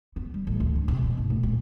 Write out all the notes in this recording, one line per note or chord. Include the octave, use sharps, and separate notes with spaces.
B3
G3
A1
D2
D4
C3
B2
G#1
A2
A#2